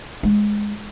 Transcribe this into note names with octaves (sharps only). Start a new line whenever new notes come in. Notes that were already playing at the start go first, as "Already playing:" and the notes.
G#3